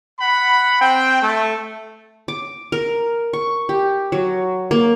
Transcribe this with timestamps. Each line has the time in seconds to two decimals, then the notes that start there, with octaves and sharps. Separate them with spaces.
0.20 F#5 B5
0.80 C4 G5
1.21 A3
2.28 D6
2.72 A#4
3.33 C#6
3.69 G4
4.12 F#3
4.71 A#3